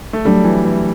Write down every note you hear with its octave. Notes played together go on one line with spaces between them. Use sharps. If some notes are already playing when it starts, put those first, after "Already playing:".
A3
F#3 G3 A3 D4 A4
E3
E3